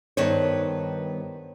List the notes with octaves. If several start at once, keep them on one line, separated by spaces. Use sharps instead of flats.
G2 D#3 B3 C5 C#5